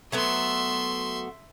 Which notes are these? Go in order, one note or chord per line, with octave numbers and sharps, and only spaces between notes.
F#3 A3 B3 E5 C6